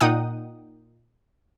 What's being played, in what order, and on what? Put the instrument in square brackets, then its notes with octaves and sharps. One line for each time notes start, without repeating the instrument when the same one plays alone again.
[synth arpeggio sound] A#2 D#4 F#5 G5 D#6